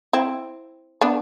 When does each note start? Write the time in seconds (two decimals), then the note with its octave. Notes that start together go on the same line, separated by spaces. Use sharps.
0.13 C4 E4
1.01 B3 D4